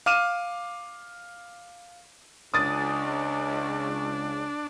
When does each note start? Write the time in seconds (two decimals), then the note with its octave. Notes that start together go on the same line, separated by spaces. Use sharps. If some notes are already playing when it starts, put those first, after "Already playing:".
0.06 F5 D6 F6 D#7 E7
2.54 C#2 D4 D#6 A6